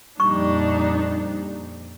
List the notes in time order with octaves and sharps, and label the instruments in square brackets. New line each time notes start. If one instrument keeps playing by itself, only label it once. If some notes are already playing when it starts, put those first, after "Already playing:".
[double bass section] F2 A#2 [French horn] G3 [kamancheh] D4 D#4 [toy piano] C#6